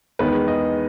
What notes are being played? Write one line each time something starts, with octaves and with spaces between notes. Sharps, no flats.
E2 D#3 G#3 B3 B4
D#5